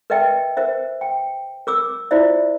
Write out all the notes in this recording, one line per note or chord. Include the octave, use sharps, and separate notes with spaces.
A#4 B4 D#5 E5 G5 A5
A#4 C5 E5
G5
A#4 D6 E6
E4 F4 C5 D5 E5